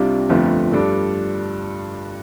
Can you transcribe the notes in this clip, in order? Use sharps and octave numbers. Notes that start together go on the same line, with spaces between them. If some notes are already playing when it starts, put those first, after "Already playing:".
Already playing: C2 C3 G3 D4 F4
G1 F2 F3 A3 F4
G2 G3 D4 A4